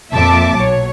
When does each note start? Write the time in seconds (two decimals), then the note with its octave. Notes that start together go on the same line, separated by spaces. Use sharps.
0.12 F2 A#2 F3 E5 A5 D6
0.58 B1 F#3 C#5